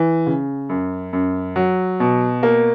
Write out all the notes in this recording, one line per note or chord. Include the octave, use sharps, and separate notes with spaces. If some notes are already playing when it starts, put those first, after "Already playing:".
Already playing: E3
C#3
F#2
F#2
F#3
B2
A#3